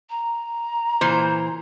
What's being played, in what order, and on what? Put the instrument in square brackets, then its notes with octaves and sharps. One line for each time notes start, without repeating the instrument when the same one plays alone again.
[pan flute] A#5
[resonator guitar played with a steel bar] A#2 E3 C5